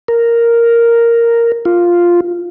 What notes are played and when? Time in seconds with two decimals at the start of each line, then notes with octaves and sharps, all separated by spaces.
0.08 A#4
1.65 F4